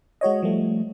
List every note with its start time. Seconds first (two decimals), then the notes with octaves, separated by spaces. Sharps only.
0.21 G#3 F#4 C#5 D#5
0.42 F3 G3 A3